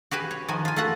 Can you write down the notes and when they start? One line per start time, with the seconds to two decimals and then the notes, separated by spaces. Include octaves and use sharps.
0.11 F#4 G4 B4 G#5
0.31 C#5
0.48 D#3 F3 F#4 G#5
0.65 F4 G#5
0.76 A3 F4 F#4 F#5